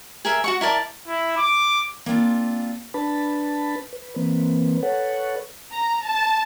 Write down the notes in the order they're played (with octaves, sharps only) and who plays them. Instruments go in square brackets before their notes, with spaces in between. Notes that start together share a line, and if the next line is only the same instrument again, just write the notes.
[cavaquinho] G#4 A#4 E5
F#4 F#5 C#6
E4 A#4 D5 A5
[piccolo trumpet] E4
D6
[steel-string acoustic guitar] A#3 C4 D4 F4
[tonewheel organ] D4 B4 A5 B5
B4
E3 A#3 C4 B4
A4 B4 C#5 F#5
[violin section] A#5
A5